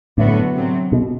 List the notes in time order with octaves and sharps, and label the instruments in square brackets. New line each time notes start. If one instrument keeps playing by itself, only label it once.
[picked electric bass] A2 [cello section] D3 F#3 B3 F#4
[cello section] C3 F#3 C4
[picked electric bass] B2